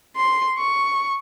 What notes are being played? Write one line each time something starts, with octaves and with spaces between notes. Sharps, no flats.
C6
C#6